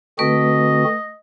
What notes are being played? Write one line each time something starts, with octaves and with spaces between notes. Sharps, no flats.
D3 A3 C4 F#4 B4 D#5